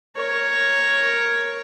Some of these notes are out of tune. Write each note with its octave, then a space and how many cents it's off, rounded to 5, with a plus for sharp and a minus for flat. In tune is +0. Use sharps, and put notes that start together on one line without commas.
A#4 +0 C#5 +0